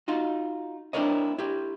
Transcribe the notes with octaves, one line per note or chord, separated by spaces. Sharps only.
D#4 F4 F#4
C4 D4 E4 A#4 C#5 D#5
E4 G4